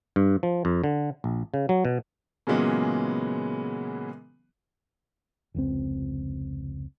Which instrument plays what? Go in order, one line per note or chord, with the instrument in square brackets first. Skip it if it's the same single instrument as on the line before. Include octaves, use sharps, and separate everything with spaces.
[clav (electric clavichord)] G2
F3
F2
D3
A#1
C#3
F#3
B2
[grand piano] A#2 C#3 E3 F#3 G#3 B3
[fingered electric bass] F1 C#2 C4